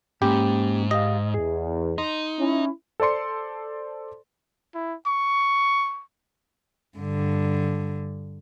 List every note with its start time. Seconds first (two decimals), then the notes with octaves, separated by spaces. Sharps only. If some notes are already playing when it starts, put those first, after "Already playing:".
0.22 G#2 A#3 C#4 G4 B5
0.91 G4 D#5 F5
1.34 E2 G#4
1.98 D#4 C6
2.38 C#4 E4
3.00 A4 C5 D5 C6 C#7
4.75 E4
5.07 C#6
6.98 G2 D3